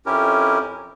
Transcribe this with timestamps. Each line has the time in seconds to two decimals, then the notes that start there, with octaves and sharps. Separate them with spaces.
0.06 F2 C#4 E4 G4 A#4